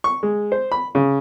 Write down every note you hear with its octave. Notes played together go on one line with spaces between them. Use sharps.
C#6
G#3
C5
B5
C#3